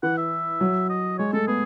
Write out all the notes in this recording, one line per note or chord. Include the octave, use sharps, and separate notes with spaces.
E3 F#5
E5
F#3
D#5
G#3 C#5
A3 A4
B3 G#4